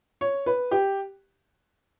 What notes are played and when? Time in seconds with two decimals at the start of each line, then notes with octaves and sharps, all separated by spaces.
0.21 C#5
0.46 B4
0.71 G4